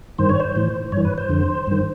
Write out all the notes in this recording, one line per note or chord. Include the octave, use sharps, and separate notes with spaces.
G2 D#3 C5
C#5
C5
A2 E3
G2 E3 C#5
B4
C5
F2 D3
G2 D#3